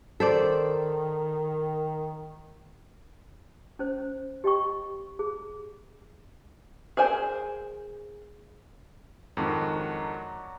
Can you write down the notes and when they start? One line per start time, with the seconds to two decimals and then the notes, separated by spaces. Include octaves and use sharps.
0.20 D#3 A4 C5 D5
3.79 C#4 C5
4.44 G4 D#5 G5 C#6
5.19 G#4
6.97 G#4 A#4 C5 G#5
9.37 F2 G#2 D#3 F#3 D4 F#4